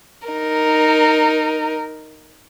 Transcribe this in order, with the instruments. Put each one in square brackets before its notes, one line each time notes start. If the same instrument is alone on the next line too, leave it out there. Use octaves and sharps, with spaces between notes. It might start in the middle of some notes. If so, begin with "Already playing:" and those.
[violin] D#4 A#4